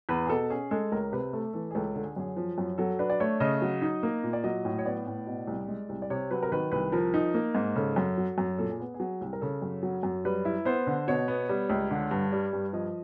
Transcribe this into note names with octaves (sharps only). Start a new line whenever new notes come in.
E2 B4
G#4
B2 A4
C#4 G#4
G#3 A4
C#2 A#4
C3 B4
A3 A4
E3 A4
G#4
C#2 A4
D3 A4
G#4
F#2 G#4
F3
F#2
F#3 A4
D4 B4
D5
A3 C#5
C#3 D#5
F#3
D#4
A#3
A#2
D5
F#3 D#5
A2
C#5
B3 D5
A2
B2
C2
G#3
C2
D5
C3 C#5
F#3 B4
A#4
D#3 B4
C2 B4
F3 A#4
D#4
A#3
G#2
C#3 A4
F#2
F#3
F#2
A#2 A4
G#4
B3
G#4
F#3
C2
A#4
C#3 A4
F#2
F#3
F#2
G3 B4
E4
B3 C5
D3
B2 C#5
B3
G3
C#2
D3
G2
G3
G2
F3 D#5